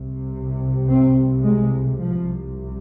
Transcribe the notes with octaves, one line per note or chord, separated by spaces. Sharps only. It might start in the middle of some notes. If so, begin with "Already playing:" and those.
Already playing: C2 C3
C4
G#3
C2 C3 F3